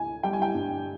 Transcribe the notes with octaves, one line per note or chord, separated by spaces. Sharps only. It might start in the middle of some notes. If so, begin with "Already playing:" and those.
Already playing: D2 G#5
G3 G5
G#5
G5
G2